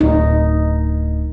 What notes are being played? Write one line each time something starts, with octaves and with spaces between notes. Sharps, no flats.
D1 D#4